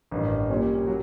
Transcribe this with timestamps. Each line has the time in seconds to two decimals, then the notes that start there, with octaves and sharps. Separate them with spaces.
0.11 A1 G2 D#3
0.50 A#2 G3 A#3 C#4
0.87 F#3